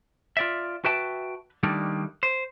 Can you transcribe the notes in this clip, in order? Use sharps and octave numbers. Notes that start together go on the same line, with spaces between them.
F4 D5 E5
F#4 B4 E5 G5 A5
D#3 G3 A3 A#3 D4 D#4
C5